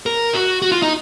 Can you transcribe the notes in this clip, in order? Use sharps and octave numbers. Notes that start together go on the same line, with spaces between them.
A#4
F#4
F#4
F4
D#4